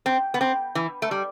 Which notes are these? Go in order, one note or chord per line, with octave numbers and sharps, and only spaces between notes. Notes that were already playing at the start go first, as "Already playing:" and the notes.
C4
B3
C4
E3
A3
G3